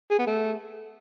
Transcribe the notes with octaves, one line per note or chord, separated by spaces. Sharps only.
G#4
B3
A3